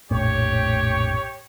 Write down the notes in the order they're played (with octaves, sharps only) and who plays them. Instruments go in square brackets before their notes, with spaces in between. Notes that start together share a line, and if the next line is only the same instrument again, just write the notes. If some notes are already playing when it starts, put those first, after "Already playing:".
[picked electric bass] F1 A#1 A2 [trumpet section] G4 C#5